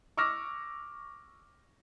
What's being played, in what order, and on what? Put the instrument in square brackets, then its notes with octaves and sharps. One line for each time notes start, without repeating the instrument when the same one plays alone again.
[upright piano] C#6 D6 E6 F6 A#6